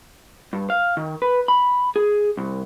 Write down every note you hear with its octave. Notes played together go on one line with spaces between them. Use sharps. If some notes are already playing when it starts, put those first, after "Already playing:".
G2
F5
D#3
B4
B5
G#4
C2